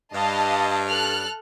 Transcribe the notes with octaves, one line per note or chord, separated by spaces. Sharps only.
G2 D#5 F5 A5
A4 F6 F#6